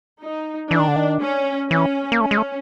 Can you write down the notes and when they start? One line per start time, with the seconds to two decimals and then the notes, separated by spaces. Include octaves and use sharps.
0.21 D#4
0.71 E3 D4
0.80 D#3
0.88 D3
0.96 D#3
1.21 C#4
1.71 E3 C#4
2.12 A#3
2.21 A3 C#4
2.31 G#3
2.37 A3